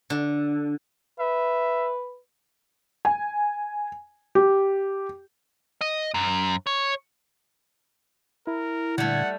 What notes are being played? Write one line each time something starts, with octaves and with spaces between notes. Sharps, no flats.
D3
B4 E5
G#5
G4
D#5
F#2
C#5
E4 A#4
A#2 D3 G3 A3 F#5 G#6